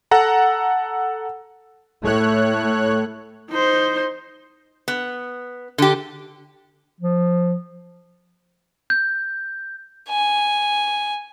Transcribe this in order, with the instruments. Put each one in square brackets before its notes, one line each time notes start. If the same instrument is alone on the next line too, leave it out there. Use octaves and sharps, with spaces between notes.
[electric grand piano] A4 F#5 A#5
[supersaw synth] A2 C#5 F#6 [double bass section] A3
[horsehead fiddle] D#4 C5
[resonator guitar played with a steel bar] B3
D3 G4
[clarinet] F3
[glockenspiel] G6
[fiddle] G#5